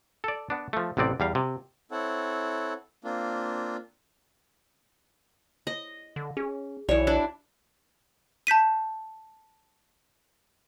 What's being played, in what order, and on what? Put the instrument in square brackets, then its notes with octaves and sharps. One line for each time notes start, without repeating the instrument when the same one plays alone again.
[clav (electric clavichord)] A4 D5
B3 D4
F3 A3
A1 C3 B3 C4 D5
E2 G3 F5
C3
[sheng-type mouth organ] C4 E4 A4 C#5 F#5
A#3 C4 D4 F4
[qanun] D#5
[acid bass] D3
[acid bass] C#4 [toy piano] G#4
[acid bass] B1 [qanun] E3 C#5 [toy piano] F#4 D5
[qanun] D4 E4
[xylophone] A5 G6 B6 D#7